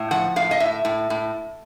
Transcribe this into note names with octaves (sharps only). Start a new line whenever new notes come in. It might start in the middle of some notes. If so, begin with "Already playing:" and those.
Already playing: A2
F3 F#5
A2 F5
D#5
A2 E5
A2
A2